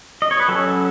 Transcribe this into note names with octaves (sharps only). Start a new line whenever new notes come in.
D#5
C#5
B4
F#3 C#4 A4